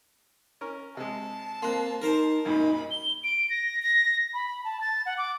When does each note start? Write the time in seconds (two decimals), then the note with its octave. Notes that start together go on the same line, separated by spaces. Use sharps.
0.61 C#4 A#4
0.97 C3 G#3 A5
1.62 A#3 C4 C6 F#6
2.02 D#4 A#4 C5
2.45 C2 F#2 A#2 D#4 D#5 B5
2.91 G7
3.24 D7
3.49 A#6
3.82 A#6
4.34 B5
4.64 A5
4.81 A6
5.06 F#5
5.17 D6